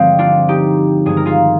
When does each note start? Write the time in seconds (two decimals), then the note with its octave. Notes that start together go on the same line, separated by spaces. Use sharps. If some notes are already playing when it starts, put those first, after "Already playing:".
Already playing: G2 D3 F3 G#3 C4
0.19 D4 F4
0.48 D#4 G4
1.06 G2 D#3 G#3 G#4
1.17 A#4
1.25 F4 G#4